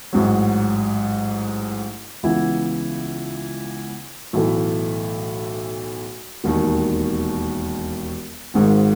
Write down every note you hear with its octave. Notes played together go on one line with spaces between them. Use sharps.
A1 G#2 F#3
C#2 C#3 E3 B3 E4
B1 A2 E3 A3
E1 D#2 D#3
G#1 G#2 D#3 G#3